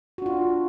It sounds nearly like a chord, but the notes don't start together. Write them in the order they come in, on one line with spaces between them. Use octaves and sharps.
F#4 D4 F4